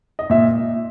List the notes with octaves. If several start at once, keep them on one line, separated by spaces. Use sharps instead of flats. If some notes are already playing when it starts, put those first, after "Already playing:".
D#5
A#2 E5